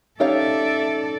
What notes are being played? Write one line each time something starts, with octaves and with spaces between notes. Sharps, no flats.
C#4 D#4 G4 A4 C#5 D5 E5 F5